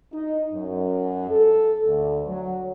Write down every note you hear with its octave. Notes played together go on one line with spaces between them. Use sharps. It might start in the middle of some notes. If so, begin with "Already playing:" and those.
D#4
F#2
A4
D2
F#3